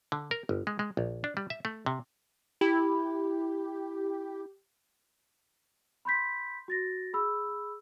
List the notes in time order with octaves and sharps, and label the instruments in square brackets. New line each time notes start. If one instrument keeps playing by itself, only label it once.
[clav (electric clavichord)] D3
A#4
G1
G#3
G#3
A#1
D4
G3
E5
A3
C3
[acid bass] E4 [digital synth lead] G4
[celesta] B5 C6 G6 B6
F#4 A6 A#6
G#4 B5 E6